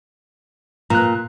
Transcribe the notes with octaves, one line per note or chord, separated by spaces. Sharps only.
A#2 A#5 F#6